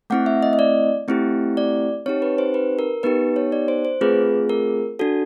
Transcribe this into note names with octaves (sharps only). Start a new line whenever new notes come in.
A3 C4 E4 F#5
E5
D#5
D#5
D5
A3 C4 E4 G4
D5
C4 D#4 G4 C#5
B4
C5
B4
A#4
B3 D#4 G4 B4
C#5
D5
C5
C5
A3 C4 F4 G#4 B4
A#4
D4 F#4 A4